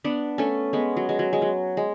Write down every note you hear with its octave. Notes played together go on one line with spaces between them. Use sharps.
B3 D4
A3 C#4
G#3 B3
F#3
G#3
F#3
G#3
F#3
G#3